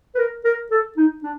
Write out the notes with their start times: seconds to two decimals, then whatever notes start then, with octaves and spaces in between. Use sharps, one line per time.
0.15 B4
0.18 A#4
0.44 A#4
0.71 A4
0.97 D#4
1.23 D4